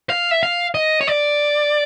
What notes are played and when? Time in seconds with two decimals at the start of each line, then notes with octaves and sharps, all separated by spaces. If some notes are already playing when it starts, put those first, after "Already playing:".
0.10 F5
0.31 E5
0.43 F5
0.75 D#5
1.01 C#5
1.07 D5